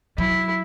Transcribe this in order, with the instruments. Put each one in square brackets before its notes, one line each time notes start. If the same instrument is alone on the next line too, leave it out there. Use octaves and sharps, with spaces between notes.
[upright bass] F#3 [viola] E4